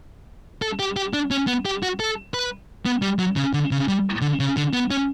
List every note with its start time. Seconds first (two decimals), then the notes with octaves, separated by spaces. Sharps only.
0.62 A4
0.79 G4
0.97 G4
1.13 D4
1.31 C#4
1.47 B3
1.66 G4
1.83 F#4
2.00 A4
2.34 B4
2.86 B3
3.02 G3
3.19 F#3
3.36 C#3
3.53 D3
3.71 C#3
3.88 G3
4.21 D3
4.40 C#3
4.57 D3
4.73 B3
4.91 C#4